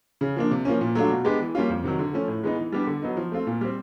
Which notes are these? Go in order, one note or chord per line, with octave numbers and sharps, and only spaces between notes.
C#3
F3 A#3 D4
C3
F3 A#3 C#4
A#2
F#3 A3 D4 F4
B2
G#3 B3 D4 G4
E3
G3 A#3 C#4 F4
F2
C3 D#3 F#3
D3
F3 A3 C#4
A2
E3 G#3 B3 D#4
E3
G3 B3 D4 G4
D3
F#3 B3 D#4
F3
A3 C4 F4
A#2
G3 C4